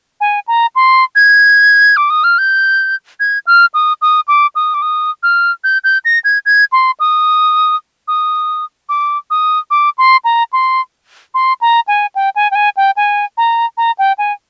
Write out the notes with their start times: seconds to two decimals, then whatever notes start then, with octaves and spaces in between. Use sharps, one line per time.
0.21 G#5
0.47 A#5
0.76 C6
1.15 G#6
1.97 D6
2.10 D#6
2.24 F6
2.38 G6
3.20 G#6
3.47 F6
3.74 D#6
4.01 D#6
4.28 D6
4.55 D#6
4.74 D6
4.82 D#6
5.23 F6
5.64 G6
5.84 G6
6.05 A#6
6.24 G#6
6.46 G#6
6.72 C6
7.00 D#6
8.08 D#6
8.89 D6
9.30 D#6
9.70 D6
9.98 C6
10.24 A#5
10.53 C6
11.34 C6
11.61 A#5
11.87 G#5
12.15 G5
12.36 G#5
12.51 G5
12.55 G#5
12.77 G5
12.97 G#5
13.37 A#5
13.77 A#5
13.98 G5
14.18 G#5